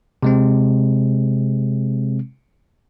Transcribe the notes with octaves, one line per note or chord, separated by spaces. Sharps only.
C3 G#3 C4